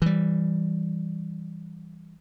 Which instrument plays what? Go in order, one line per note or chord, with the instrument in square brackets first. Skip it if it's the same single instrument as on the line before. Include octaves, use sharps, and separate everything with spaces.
[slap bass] E3 G3